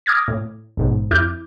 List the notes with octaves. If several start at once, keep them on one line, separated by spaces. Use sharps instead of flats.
D6 D#6 F6 G#6 A#6
A2
A1 G#2 B2
F2 E4 D6 F6 G6